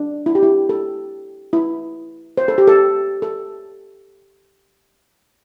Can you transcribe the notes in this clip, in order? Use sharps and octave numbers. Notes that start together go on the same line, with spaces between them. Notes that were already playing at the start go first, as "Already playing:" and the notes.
Already playing: D4
E4
G4
E4
A4
E4
C5
A4
G4
A4
A4